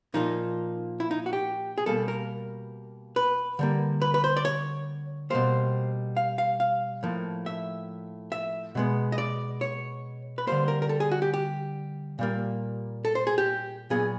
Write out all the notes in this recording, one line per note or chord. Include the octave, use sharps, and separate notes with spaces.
A#2 F3 A#3 D#4
E4
D#4
F#4
G4
G#4
B2 G3 A#3 A4
A#4
B4
D3 G3 A#3
B4
B4
C5
D5
C#5
B2 G3 A#3 C5
F5
F5
F5
A2 F3 A#3
E5
E5
B2 G#3 B3
D#5
D5
C#5
B4
D3 G3 A#3 C5
A#4
A#4
A4
G#4
F#4
G4
G4
A#2 G3 A#3
A4
C5
G#4
G4
A#2 F#3 B3 G#4